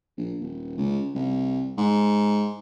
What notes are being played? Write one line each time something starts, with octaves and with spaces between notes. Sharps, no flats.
A#1
D#1
C#2
C2
G#2